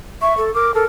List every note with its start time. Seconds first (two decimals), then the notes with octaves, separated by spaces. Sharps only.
0.22 E5 C#6
0.37 A4
0.55 A#4 D6
0.74 A4 A#4